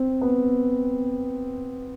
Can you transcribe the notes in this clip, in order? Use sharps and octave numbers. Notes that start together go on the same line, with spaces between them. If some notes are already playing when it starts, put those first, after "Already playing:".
Already playing: C4
B3